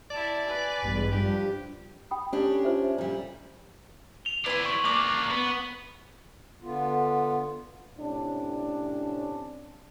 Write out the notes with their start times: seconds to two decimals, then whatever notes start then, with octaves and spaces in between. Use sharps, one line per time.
0.11 E4 D5 A5
0.47 B4 G#5
0.83 A1 E2 G2 G#3
1.12 F3 G3 D4 G4
2.11 G5 B5 D#6
2.33 C#4 D4 G4
2.65 F4 C5 E5
2.98 A#2 G3
4.25 F7 G7
4.46 E4 B4 D5 C6
4.65 C#6 F#7
4.85 A#3 D4 D6
5.31 B3
6.62 D3 B3 F4
7.98 A2 C3 C#4 D4